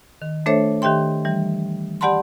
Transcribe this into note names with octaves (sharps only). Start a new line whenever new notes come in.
D#3
A3 D4 A4 C5 C#5 E5
D#3 G4 E5 G5 C6
E3 G3
G4 D5 F#5 A5 B5 C6